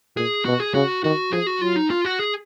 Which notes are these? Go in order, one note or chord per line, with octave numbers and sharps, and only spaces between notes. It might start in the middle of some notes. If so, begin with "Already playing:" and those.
A#2 G#4
B2 F#4
G#4
C#3 F#4
D#3 F#4
F3 G#4
F#4
F#3 F4
D#4
F4
F#4
G#4